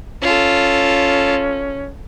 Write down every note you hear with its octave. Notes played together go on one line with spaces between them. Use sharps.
C#4 F4 A4